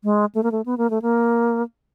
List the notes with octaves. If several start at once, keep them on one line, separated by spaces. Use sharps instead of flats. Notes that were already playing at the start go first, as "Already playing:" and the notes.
G#3
A3
A#3
A3
B3
A#3
A3
A#3